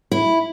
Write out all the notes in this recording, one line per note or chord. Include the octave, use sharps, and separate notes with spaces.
E4